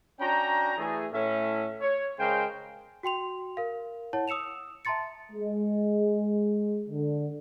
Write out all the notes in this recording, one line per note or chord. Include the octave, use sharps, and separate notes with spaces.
C#4 D4 F#4 G5 A#5
E3 A3 G#4
A2 C#4 E5
C#5
C#3 G#3 A#4 C5 F5 G5
F#4 G5 C6 F7
A#4 F5
E4 C#5 F#5 A5
D#6 E6 C#7 E7 F7
E5 A5 A#5 C6 A6 C#7
G#3
D3